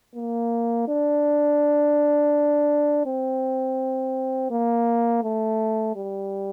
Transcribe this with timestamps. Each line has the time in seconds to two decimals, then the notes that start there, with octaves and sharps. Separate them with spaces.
0.15 A#3
0.88 D4
3.06 C4
4.51 A#3
5.23 A3
5.96 G3